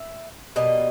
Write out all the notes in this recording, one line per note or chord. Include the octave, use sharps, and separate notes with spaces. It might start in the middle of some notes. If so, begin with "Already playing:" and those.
Already playing: E5
B2 G3 A#3 D#5